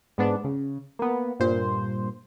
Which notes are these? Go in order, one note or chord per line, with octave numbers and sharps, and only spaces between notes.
G#2 B3 D4
C#3
A#3 B3
G2 A#2 C5